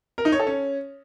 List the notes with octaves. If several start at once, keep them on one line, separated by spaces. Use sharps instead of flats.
A#4
D#4
C#5
A4
C#4